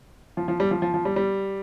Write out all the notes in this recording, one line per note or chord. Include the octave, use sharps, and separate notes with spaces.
F3
F3
G3
F3
F3
F3
G3
G3